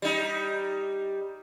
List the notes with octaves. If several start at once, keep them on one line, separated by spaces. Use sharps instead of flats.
G3 D#4